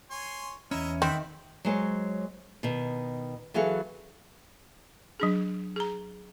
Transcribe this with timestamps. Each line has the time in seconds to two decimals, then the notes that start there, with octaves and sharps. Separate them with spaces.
0.11 C#5 G#5 C6
0.71 E2 C#4 E4 D#5 E5 A#5
1.02 D#3 C4 E5 F#5 B5
1.65 F#3 G#3 C5 C#5
2.63 B2 D#3
3.54 E3 F#3 G#4 A4 F5 F#5
5.20 F#3 D4 G#4
5.76 G#4 A#5